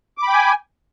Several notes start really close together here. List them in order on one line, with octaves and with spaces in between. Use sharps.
D6 B5 G5 G#5